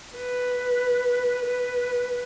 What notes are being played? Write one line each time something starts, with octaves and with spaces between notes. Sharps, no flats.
B4
B4